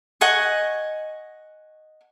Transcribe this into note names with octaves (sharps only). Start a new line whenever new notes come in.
D#5 F#5 G#5 C#6